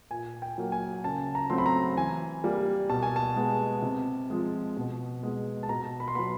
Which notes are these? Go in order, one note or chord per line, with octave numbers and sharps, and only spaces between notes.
A#2 G#5
G5
F#3 A#3
G#5
C#3 A5
A#5
F#3 A3 C4 C6
B5
A#5
E3 G#5
G3 A#3
B2 A5
G#5
A5
G#3 B3
C3
F3 G#3
B2
G#3 B3
A5
B2 A#5
B5
C6
F#3 B3 B5